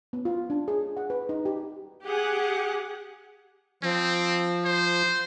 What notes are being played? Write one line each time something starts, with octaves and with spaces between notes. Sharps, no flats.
B3
F4
D4
G#4
F#5
B4
D#4
G4
G4 G#4 F#5
F3 C4
C5